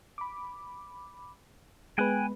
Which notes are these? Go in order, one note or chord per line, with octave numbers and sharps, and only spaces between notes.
B5 D6
G#3 B3 B4 G5 G#5 F#6